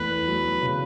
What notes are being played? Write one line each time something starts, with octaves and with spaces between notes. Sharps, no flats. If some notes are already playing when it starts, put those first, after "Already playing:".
Already playing: E2 A3 B4
F#3
C#3